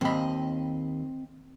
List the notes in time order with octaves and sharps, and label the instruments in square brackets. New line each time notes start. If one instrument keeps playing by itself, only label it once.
[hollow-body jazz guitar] D#2 B5 [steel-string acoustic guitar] C4 D#5